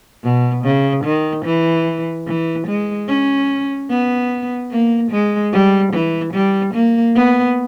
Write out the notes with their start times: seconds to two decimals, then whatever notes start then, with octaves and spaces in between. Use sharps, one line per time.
0.23 B2
0.64 C#3
1.04 D#3
1.45 E3
2.27 E3
2.67 G#3
3.08 C#4
3.90 B3
4.71 A#3
5.11 G#3
5.53 G3
5.93 E3
6.33 G3
6.74 A#3
7.15 B3